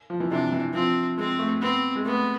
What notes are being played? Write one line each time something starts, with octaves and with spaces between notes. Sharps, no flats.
F3
E3
C3 D4
E3
F3 C4
G#3 C4
A3
B3 C4
G#3
A3 B3